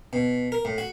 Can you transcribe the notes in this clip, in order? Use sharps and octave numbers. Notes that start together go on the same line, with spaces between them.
B2
A#4
A2
F#4